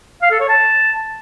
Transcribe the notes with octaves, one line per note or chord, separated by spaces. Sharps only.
F5
A4
C#5
A5